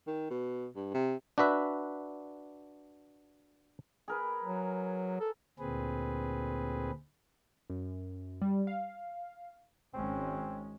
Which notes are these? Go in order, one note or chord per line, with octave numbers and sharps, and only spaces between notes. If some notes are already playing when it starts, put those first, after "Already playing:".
D#3
B2
G2
C3
D4 F#4 B4 E5
G#4 A#4 B4
F#3
A4
D2 A#2 C4 G#4 B4
F#2
G3
F5
G#1 G#3 C4 C#4